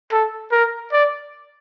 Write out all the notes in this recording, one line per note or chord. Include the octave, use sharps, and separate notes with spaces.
A4
A#4
D5